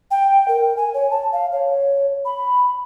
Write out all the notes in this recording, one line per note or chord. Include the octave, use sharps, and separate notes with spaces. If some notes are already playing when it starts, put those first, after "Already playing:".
G5
A#4
G#5
C#5
A5
F5
C#5
B5